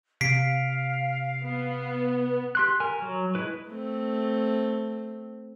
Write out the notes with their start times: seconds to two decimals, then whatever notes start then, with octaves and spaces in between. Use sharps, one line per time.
0.21 C3 F5 B6 C7 D7
1.44 B3
2.55 G4 C6 F#6
2.80 A#4 G#5
3.02 F#3
3.35 G#3 E4 B4
3.69 A3 C4